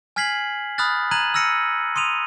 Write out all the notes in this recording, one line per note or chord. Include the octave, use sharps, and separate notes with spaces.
G#5 F6 G#6 B6 C7 F#7
B5 D#6 F6 F#6 A6
A#5 F#6 G#6 D#7 F#7
E6 F6 A#6 C#7 D#7
C6 D#6 D#7 F7